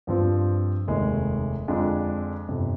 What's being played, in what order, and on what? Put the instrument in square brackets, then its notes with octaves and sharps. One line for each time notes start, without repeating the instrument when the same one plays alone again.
[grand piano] G2 F3 C4 F4
F1 D#2 D#3 G#3
F2 D3 G#3 D4 F4
G1 F2 C3